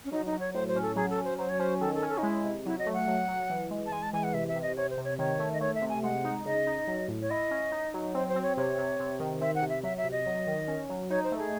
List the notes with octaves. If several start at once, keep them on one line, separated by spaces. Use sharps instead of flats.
C#4
F#3 D#4
D#4
F#3
C#5
A2 C5
C5
C#4
A4
F#3 G#4
A4
C#4
C5
F#3 C5
C#5
C#4 C5
D#3 A4
A4
C#4
A4
D#4
G#3 E4
C3
F#3 E4
D#5
A3
F#5
F#3
F#3
E3
G#3
A5
G#3 G#5
A5
E3 G#5
F#5
C3 E5
E5
C3
D#5
C3 C#5
C5
C3
C#5
D#3 C#5
A3
D#5
A3 C#5
E5
C3
G#5
G#3 F#5
D#4
C#3 D#5
D#4
F#3
A2
C#5
E4 D#5
C#4
D#4
F#3
C4 C5
C5
C4
C#5
C3 C#5
C3
C3
D#3
C4 E5
F#5
C3
E5
F#3 E5
E5
C3
D#5
F#3
D#3
C#4
F#3
D#4 C#5
C5
A3
G#4